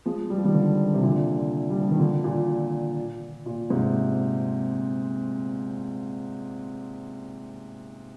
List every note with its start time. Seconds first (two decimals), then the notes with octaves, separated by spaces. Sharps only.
0.06 F3 G#3
0.30 G3
0.38 F3
0.44 D#3 G3
0.54 D3 F3
0.94 C3
1.03 A#2 D3
1.70 G3
1.80 F3
1.91 D#3
1.99 A#2 D3
2.24 A#2
3.46 A#2
3.70 G#2 C3